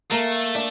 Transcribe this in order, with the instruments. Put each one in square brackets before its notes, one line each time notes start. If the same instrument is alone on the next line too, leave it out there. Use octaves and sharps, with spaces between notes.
[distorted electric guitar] A3 [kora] A#3
[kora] D4